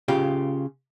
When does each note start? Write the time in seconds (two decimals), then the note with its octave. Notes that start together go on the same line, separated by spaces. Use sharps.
0.08 C#3 F4 G4